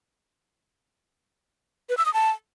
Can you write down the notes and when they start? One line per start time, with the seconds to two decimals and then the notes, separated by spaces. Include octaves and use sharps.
1.89 B4
1.98 E6
2.06 D#6
2.14 A5